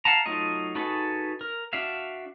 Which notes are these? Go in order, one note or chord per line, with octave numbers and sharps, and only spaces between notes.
F5 F#5 A5 A#5
F#3 A3 D#4 F4 D#5
D#4 F#4 G#4 A4 B4
A#4
D4 F#4 E5 F5